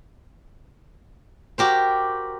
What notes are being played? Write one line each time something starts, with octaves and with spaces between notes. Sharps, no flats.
F#4 G4 A#4 C5